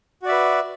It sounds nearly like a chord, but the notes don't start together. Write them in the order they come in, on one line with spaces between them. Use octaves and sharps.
F#4 D5 E5 B4